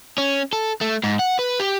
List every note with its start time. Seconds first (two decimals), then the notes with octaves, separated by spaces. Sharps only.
0.18 C#4
0.53 A4
0.81 A3
1.03 G#2
1.19 F#5
1.39 B4
1.59 G4